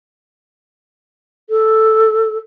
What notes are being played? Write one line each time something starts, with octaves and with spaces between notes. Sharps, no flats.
A4